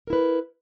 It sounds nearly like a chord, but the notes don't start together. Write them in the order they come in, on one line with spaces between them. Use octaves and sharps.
A#4 E4 B4